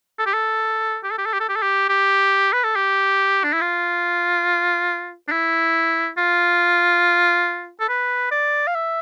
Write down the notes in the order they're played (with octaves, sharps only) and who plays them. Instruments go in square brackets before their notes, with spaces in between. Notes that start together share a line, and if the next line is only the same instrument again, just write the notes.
[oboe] A4
G4
A4
G4
A4
G4
A4
G4
A4
G4
A4
G4
G4
B4
A4
G4
D4
E4
F4
D4
E4
F4
A4
B4
D5
F5
E5